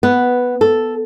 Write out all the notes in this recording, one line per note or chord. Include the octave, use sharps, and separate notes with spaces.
B3
A4